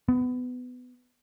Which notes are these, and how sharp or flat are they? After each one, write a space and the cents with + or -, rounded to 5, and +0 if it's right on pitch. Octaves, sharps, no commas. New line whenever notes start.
B3 +20